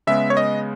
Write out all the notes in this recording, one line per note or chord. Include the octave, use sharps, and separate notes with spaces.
C#3 G#3 B3 E5
C#5
D#5